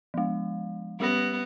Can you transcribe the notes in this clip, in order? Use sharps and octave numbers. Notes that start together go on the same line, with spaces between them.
F3 G#3
G3 B3 G4 A#6